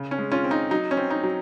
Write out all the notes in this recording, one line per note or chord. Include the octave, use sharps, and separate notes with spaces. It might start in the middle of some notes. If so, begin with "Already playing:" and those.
Already playing: C#3
C#4
G#3
C#4 F4
C4
D#4
F#3 D#4
C#4
C4
D#4
F#3